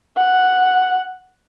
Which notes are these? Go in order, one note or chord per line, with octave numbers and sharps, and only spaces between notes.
F#5